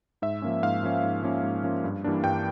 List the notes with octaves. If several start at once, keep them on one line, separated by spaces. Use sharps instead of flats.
G#2 E5
F3 A#3 C#4
G#2 F5
F3 A#3 C#4
G#2
F3 A#3 C#4
G#2
F3 A#3 C#4
G2
E3 G3 A#3 D4
G2 G5